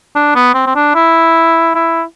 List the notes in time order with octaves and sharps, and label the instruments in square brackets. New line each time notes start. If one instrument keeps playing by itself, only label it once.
[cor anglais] D4
B3
C4
C4
D4
E4
E4